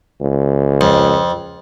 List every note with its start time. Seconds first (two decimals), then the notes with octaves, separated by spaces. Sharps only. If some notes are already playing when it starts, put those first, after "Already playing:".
0.21 C#2
0.81 F2